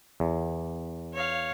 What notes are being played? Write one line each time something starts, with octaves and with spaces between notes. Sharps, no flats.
E2
C#5 F5